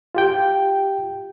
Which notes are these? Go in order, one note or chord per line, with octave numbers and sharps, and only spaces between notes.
F4 G4 G5